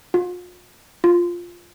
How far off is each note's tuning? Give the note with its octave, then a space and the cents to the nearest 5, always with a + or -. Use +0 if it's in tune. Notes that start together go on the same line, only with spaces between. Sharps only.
F4 +40
F4 +0